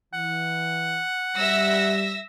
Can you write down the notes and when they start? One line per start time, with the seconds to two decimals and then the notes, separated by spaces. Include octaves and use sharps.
0.14 E3 F#5
1.37 G3 E5 E6 A#6